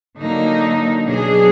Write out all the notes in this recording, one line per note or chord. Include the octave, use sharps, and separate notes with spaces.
D3 F#3 A#3 D#4
B2 F#3 D4 G#4